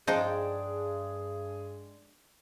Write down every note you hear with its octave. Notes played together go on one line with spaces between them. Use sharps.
G2 F3 G#3 D4 D#4 G#4 G5